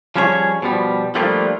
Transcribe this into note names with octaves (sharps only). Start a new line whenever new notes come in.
F3 G3 C#4 E4 G#4 C#5
B2 F3 G3
F3 G3 A3 A#3 D4 F4